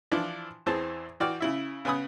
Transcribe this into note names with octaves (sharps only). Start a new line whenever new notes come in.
E3 F3 D4 E4
E2 E3 C4 G#4 A5
E3 F#4 D5 G5 F6
C#3 E4 E5
C#3 B3 G#5 B5 D#6